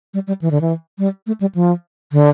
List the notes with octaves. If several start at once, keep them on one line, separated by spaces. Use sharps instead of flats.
G3
G3
E3
D3
E3
G3
A3
G3
F3
D3